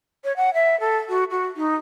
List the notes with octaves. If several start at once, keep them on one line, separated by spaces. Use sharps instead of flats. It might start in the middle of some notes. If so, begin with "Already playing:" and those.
C#5
F#5
E5
A4
F#4
F#4
D#4